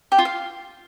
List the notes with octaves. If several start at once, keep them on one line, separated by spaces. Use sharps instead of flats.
G4
F4
F5